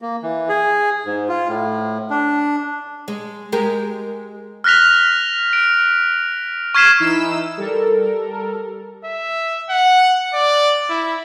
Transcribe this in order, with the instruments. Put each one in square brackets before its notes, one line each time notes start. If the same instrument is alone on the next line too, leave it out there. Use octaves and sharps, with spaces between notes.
[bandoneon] A#3
E3
G#4
G#2
F4
A2
D4
[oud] G#3
G#3 G4 A#4
[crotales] F6 F#6 A#6 B6 F7
D7
C#6 F6 G#6 B6 C7 E7
[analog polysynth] E3 D#4 E4 B4 E6 E7
G3 A4 A#4
[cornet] E5
F#5
D5
E4